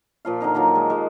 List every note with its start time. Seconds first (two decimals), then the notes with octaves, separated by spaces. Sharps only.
0.25 A#2 F3 F5
0.40 D3 D#3 D#4 F5
0.55 D#3 F3 F#3 A#3
0.75 G#3
0.90 G#3 G4